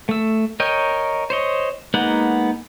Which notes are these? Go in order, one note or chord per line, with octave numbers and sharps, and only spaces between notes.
A3 E6
A#4 C#5 D#5 G5
C5 C#5 D#5
G#3 A#3 B3 D#4 F#5